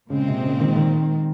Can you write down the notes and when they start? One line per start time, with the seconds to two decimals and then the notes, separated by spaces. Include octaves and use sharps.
0.10 A#2 C#3 G#3 C4
0.27 C3
0.43 C#3
0.60 D#3
0.76 D#3